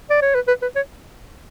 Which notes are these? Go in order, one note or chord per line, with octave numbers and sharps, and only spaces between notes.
D5
C#5
B4
B4
B4
C#5